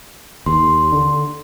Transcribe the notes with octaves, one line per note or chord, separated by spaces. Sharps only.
D#2 C6
D3